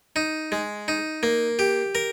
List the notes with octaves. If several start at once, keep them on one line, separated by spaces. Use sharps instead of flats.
D#4
G#3
D#4
A#3
G4
A#4